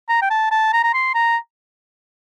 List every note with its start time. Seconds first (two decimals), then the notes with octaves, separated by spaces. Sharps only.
0.09 A#5
0.22 G5
0.30 A5
0.51 A5
0.73 A#5
0.84 A#5
0.94 C6
1.15 A#5